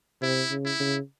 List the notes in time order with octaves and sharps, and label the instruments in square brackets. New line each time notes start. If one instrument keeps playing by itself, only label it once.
[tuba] C3 [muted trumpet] E4
[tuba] C#3
[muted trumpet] E4
[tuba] C#3